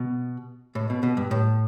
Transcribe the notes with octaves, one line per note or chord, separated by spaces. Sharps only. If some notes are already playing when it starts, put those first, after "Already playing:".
Already playing: B2
A2
B2
B2
G2
A2